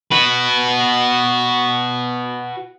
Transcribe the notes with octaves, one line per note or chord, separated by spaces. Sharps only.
F#4 B4